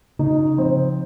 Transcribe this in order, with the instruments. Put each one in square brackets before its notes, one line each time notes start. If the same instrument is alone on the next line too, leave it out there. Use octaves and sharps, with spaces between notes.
[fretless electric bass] C#3 [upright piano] D#4
[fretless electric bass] F3 [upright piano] C4